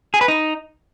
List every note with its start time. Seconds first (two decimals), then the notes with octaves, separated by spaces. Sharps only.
0.14 G#4
0.21 B4
0.28 D#4